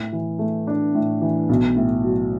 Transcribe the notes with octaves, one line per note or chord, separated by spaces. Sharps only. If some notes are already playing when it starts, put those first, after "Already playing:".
Already playing: A2
E3
A3
D4
A2
E3
B1
A2
F#3